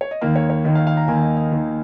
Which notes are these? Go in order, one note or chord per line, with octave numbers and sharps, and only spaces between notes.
C#5
D#5
D#2 D#3 A#3 F5
C#5
C#5
D#2 D#3 A#3 D#5
F5
F5
A#5
D#2 D#3 A#3 G#5
D#5
D#5
D#2 D#3 A#3